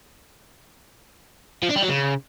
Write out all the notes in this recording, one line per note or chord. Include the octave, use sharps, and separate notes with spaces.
F3
D4
G3
F#3
C#3